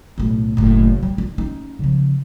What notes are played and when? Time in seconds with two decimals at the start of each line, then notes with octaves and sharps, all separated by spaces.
0.18 B1 A2
0.57 F#1 A2
1.03 G3
1.18 D4
1.38 C#4 D#4
1.79 C#3 F3